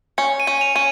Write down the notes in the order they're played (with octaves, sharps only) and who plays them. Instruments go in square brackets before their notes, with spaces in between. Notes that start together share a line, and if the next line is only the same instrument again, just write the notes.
[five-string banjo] C#4 [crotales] C#7
[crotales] D#7
[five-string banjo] C#4
[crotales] F7
[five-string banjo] C#4 [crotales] D#7